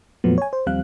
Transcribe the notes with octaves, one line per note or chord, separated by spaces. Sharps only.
F2 A#2 F3 F#3 A3 B3
C#5 G#5
C5
D#2 F3 G3 C4 F5 F#6